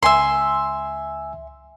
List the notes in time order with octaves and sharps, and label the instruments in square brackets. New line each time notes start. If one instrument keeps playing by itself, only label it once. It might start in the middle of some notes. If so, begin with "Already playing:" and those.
[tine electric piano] C#2 G#5 E6 [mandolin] E5 C6